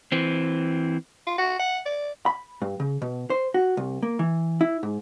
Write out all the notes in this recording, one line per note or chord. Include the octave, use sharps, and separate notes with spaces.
E3 C4
F4
F#4
F#5
D5
B5
G2
C#3
B2
C5
F#4
C2
A#3
E3
E4
G#2